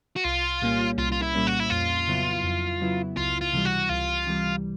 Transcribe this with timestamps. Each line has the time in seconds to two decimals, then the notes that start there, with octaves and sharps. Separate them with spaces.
0.16 F#4
0.25 C2 F4
0.62 A#2 G3 A#3 C#4
0.98 C2 F4
1.12 F4
1.22 E4
1.35 A#2 G3 A#3 C#4
1.47 F#4
1.60 E4
1.70 F2 F4
2.07 C#3 F#3 B3 E4
2.43 F2
2.81 C#3 F#3 B3 E4
3.17 C#2 F4
3.41 F4
3.53 C3 E3 G3
3.65 F#4
3.89 C#2 F4
4.26 C3 E3 G3